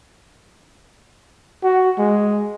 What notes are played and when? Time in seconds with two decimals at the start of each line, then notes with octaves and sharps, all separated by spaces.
1.64 F#4
1.98 G#3